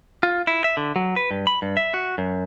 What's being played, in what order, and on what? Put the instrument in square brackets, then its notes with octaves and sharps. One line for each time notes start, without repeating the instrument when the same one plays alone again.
[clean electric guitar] F4
E4
E5
D3
F#3
B4
G2
B5
G2
E5
F#4
F#2